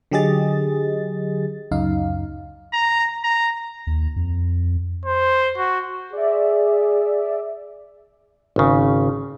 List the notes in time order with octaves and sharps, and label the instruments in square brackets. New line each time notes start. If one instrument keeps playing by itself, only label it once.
[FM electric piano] D3 F#3 G4 G#4 D#5 A6
C#2 F#2 D#4 F5
[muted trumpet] A#5
A#5
[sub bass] D#2
F2
[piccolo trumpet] C5
F#4
[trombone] G#4 [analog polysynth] D5 E5
[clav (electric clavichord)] G#1 C#3